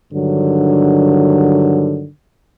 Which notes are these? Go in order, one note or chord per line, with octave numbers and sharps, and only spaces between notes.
G2 D3 D#3 F#3